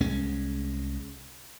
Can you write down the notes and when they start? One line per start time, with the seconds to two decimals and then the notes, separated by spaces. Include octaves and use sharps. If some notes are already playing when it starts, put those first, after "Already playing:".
0.01 C2 G#3 C#4